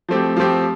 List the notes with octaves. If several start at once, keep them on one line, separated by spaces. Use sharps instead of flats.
F3 A3 C4 G4
F3 A3 C4 G4